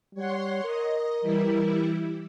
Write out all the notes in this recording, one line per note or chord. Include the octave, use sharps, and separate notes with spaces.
G3 C#5 F#5 C6
A#4 D#5
E3 G3 E4